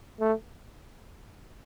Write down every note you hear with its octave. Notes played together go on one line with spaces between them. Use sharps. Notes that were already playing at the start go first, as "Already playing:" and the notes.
A3